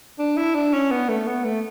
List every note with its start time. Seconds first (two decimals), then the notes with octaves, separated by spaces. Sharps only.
0.19 D4
0.37 E4
0.55 D4
0.73 C#4
0.91 B3
1.09 A3
1.27 B3
1.45 A3